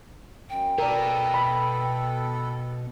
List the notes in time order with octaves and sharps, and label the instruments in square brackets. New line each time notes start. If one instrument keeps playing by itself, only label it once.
[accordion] F#2 [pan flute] G5
[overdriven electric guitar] B2 [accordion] B3 A4 [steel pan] A#4 D5
[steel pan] B5